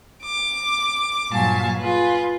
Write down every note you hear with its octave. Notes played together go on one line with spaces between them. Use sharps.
D6
G2 A#2 F#3 F5 G#5 A5
F4 G#4 B4